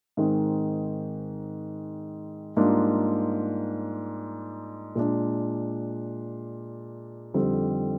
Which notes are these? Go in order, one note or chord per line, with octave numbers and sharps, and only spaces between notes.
G#2 D#3 G#3 C4
G#2 G3 A#3 D4 F4
A#2 G#3 D4
F2 D3 G3 C4 D#4